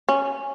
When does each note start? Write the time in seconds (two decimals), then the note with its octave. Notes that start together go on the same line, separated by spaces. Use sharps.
0.09 C#4